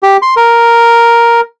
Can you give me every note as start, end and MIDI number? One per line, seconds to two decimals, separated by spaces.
0.03 0.17 67
0.22 0.34 84
0.36 1.41 70